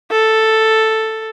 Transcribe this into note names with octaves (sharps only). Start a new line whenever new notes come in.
A4